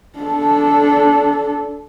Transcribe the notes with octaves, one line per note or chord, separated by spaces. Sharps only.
D4 A4